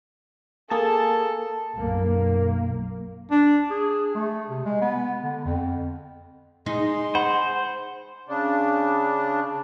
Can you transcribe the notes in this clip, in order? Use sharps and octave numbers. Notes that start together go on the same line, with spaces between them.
A#3 G#4 A4 A5
B1 F#2 A#3
D4
G#4
A3
C3
G#3
B3
D3
F2
G#3 D#4 C6
C5 F#5 B5
C#3 D4